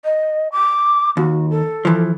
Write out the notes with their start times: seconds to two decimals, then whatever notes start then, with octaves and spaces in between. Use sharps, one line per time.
0.04 D#5
0.52 D6
1.17 D#2 F#4
1.50 A4
1.85 E3 F3